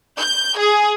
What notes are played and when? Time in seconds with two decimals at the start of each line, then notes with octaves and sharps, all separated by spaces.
0.19 G6
0.57 G#4